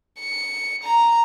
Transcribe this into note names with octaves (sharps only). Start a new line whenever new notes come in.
C#7
A#5